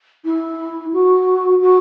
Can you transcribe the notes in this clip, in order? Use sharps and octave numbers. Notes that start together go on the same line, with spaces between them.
E4
F#4
F#4